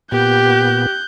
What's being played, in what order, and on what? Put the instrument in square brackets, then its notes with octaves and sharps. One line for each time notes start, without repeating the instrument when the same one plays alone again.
[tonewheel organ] A#2 B3 [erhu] G4 [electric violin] F#6 G6